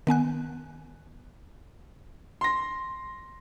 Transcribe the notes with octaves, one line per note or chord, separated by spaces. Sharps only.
D#3 B3 G#5 F#6
C6 A#6